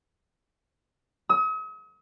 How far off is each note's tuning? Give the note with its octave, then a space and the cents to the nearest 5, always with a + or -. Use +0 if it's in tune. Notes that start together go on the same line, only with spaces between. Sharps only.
D#6 +45